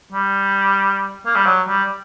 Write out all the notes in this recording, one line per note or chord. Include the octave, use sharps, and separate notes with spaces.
G3
A#3
G3
F#3
G3